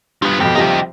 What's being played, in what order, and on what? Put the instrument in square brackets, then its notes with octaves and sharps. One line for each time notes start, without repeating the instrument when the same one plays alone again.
[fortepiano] G2 [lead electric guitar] F3 B3
[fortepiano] F2 B2 [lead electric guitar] C4 G4
[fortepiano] C3 F3 G3 [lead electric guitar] D#4 G4